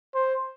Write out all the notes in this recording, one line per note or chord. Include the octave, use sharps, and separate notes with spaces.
C5